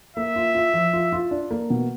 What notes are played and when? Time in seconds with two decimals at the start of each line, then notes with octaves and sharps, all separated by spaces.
0.16 A#3 E5
0.36 F4
0.55 F4
0.74 F3
0.93 F4
1.12 F4
1.31 D4
1.51 A#3
1.70 B2